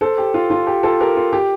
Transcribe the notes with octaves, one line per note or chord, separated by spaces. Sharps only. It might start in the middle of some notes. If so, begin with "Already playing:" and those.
A4 C5
G4
F4
F4
G4
F4 A4
G4 A#4
F4
G4